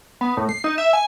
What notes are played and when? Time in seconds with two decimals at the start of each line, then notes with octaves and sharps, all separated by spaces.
0.21 B3
0.37 A2
0.49 C7
0.64 D#4
0.78 E5
0.93 G#5